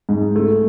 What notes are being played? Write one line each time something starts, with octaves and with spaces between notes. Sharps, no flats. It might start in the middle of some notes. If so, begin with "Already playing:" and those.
G#2
A3